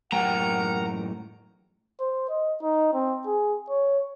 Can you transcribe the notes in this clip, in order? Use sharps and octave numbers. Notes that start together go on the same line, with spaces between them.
F#2 A2 G4 A#4 F#5 G5 A#5
C5
D#5
D#4
C4
G#4
C#5